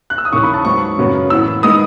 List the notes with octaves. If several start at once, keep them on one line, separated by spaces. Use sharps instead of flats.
F#6
E6
D#6
D#2 C#3 E3 C#6
B5
A5
G#2 F#3 B3 C#6
F#2 C#3 F#3 B3
A2 E3 B3 E6
D#3 G#3 B3 D#6